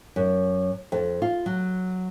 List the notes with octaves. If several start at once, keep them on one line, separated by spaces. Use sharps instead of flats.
F#2
F2
F4
F#3